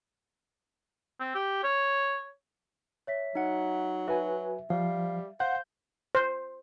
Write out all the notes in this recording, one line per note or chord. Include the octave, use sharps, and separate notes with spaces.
C4
G4
C#5
C#5 E5 B6
F#3 D#4 F#5
F#4 B4 E5 G#5
F3 G3 F5
C5 F5 F#5 G6
C5